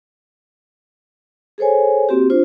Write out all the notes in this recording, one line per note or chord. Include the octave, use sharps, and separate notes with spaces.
G#4 A4 C5 C#5 G#5
A#3 C4 F#4 G4
D4 F4 C5